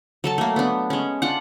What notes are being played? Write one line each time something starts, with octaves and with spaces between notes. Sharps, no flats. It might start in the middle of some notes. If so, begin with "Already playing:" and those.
F#3 A4 A5
A3 A#3
B3 D4
G#3 C#4
D4 F4 F#5